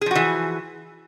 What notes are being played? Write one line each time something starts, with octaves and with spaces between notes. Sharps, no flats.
E3 F3 F#4 G#4